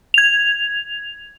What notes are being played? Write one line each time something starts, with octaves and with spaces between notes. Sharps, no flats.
G#6 F7